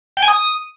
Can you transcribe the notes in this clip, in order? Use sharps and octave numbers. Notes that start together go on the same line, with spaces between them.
G5
G#5
D#6